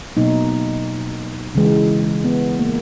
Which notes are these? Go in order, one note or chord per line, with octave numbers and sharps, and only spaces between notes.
B2 F#3 A#3 D#4
C#3 E3 G#3
B3
A#3